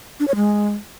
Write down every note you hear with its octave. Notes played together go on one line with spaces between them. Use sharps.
D4
C#5
G#3